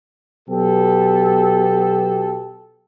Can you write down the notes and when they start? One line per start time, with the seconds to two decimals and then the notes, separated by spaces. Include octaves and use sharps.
0.49 B2 F#3 B3 G4 A4